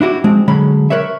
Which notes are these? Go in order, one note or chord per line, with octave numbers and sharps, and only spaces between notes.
D4 E4 F#4 G4
F3 G#3 C4 D4
D3 F#3 G#3 C#4 B5
A#4 B4 C#5 E5